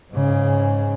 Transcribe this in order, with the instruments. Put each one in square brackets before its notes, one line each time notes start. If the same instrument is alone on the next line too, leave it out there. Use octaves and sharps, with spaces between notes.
[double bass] G#2 C#3